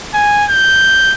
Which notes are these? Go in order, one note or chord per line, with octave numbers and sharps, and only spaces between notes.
G#5
G6